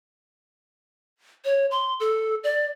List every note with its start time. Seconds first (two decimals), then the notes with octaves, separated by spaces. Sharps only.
1.45 C#5
1.71 C6
2.00 A4
2.44 D5